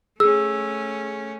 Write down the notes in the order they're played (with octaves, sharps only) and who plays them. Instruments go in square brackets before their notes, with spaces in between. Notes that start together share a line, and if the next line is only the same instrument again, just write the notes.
[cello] A3 C#4 [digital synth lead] G#4 [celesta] E6